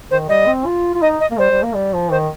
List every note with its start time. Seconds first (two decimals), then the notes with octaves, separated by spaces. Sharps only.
0.10 D#3 C5
0.29 G3 D#5
0.47 C4
0.66 F4
0.95 F4
1.02 D#4 D#5
1.20 D#5
1.31 A#3
1.39 G3 C5
1.51 G3
1.63 A#3
1.75 G3
1.93 F3
2.11 D#3 C5